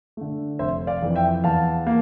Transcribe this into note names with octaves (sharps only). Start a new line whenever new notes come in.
D3 A3
F1 C5 E5
D5 F5
F2 E3
E5 G5
E2 F5 A5
A#3